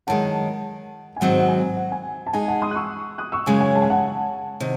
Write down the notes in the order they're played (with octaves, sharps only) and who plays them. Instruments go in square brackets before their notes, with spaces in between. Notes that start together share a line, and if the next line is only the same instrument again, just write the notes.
[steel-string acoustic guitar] F#2 D#3 G#3 [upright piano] F#5 A5
[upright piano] G#5
[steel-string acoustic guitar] G#2 D#3 F#3 C4 [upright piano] F#5
[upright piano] F#5
G#5
F#5
G#5
A5
[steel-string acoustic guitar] G#3 D#4 G#4 [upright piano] G#5
[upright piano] F#5 A5
C6 D#6
F#6
C#6 E6
D#6 F#6
C#6 E6
[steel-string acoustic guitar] F#2 C#3 G#3 [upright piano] G#5
[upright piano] G#5
A5
G#5
F#5 A5
[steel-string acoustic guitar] C3 D#3